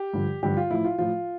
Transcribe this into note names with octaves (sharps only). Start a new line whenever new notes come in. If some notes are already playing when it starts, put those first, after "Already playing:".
Already playing: G4
G2 D3 F3
G2 D3 F3 G4
F4
A2 F3 E4
F4
A2 F3 F4